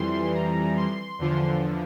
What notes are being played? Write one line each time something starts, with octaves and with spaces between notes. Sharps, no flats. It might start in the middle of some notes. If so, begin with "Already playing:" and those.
Already playing: F2 E3 G3 C6
A#5
C6
E2 D3 F3